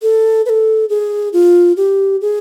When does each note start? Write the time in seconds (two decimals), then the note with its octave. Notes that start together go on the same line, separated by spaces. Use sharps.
0.02 A4
0.46 B4
0.49 A4
0.89 G#4
1.33 F4
1.77 G4
2.21 G#4